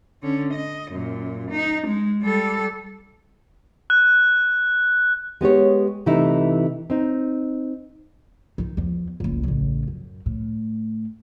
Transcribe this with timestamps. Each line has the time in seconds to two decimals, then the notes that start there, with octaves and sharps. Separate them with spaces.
0.23 D3 C#4
0.53 D#5
0.91 F#2 A#2
1.51 D#4
1.87 G#3
2.22 G3 A4
3.90 F#6
5.41 G#3 B3 G4 C#5
6.06 C3 E3 A3 D#4 E4
6.90 C4 D#4
8.58 D#3 D#4
8.77 E2 F3
9.20 F#1 C#2
9.43 A1 C#3
9.88 F#2
10.26 A2